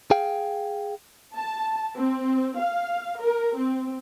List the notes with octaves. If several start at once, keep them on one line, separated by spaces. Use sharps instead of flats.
G#4 F5 G5
A5
C4
F5
A#4
C4